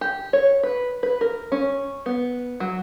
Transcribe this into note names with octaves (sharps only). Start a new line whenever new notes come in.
G4
C#5
B4
B4
A#4
C#4
B3
F#3